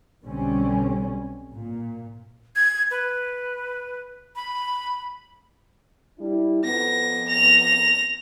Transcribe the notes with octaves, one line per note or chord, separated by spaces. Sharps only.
B1 B2 D3 G3 C4 C#4
A#2
G#6
B4
B5
G3 D4 E4
F2 B3 A#6
A#6 F7